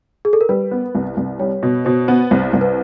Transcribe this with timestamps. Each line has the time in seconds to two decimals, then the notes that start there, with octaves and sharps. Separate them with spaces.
0.25 G#4
0.33 A4
0.41 A#4
0.49 G3 B4
0.71 B3
0.95 C2
1.17 C2
1.39 G3 C#5
1.63 B2
1.85 B2 C5
2.08 B3
2.31 C2 C5
2.53 C2
2.61 B4